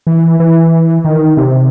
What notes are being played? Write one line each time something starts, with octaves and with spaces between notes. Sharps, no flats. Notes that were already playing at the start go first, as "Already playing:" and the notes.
E3
E3
D#3
C3